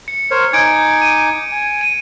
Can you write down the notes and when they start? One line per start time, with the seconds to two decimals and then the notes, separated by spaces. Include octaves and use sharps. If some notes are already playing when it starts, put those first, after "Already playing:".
0.08 C#7
0.31 A#4 C5 C#5
0.53 D#4 G#5 D6 G#6 D7
1.02 D#7
1.51 G#5
1.81 D#7